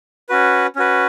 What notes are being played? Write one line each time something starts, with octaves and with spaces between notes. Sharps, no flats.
C#4 F#4 B4
C#4 F#4 B4